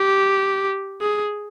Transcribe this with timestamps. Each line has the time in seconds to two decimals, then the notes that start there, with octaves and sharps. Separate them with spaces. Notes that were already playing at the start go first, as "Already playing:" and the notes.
Already playing: G4
1.02 G#4